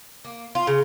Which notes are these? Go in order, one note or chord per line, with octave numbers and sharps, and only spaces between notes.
A#3
F4
C#3